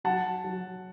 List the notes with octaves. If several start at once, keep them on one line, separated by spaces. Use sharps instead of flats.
F#3 F#5 A5
F#3